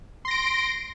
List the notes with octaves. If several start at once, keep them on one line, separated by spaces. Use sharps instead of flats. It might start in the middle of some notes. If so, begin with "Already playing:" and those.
C6 A#6 D7